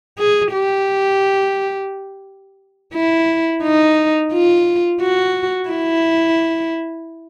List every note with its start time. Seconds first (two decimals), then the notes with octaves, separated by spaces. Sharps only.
0.18 G#4
0.53 G4
2.94 E4
3.63 D#4
4.32 F4
5.01 F#4
5.70 E4